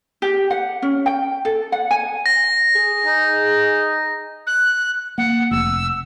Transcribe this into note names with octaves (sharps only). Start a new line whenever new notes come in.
G4
F#5
C#4
G5
A4
F#5
G#5
A#6
G#4
D#4
F#6
A#3 F#5
F1 E6